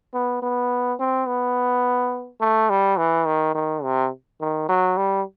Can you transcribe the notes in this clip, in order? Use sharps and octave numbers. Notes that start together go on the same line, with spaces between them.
B3
B3
C4
B3
A3
G3
E3
D#3
D#3
C3
D#3
F#3
G3